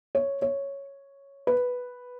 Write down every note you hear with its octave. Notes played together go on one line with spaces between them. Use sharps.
C#5
C#5
B4